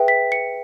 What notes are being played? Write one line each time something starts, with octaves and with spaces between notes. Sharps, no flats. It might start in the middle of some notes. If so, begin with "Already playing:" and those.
Already playing: G#4 B4 E5 G5
B6
C#7